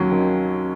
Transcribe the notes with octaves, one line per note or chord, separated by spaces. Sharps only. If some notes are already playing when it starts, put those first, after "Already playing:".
Already playing: D#2 F#3 C#4
D#3